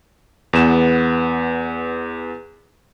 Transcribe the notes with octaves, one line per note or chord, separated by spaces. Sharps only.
E2 B3 E7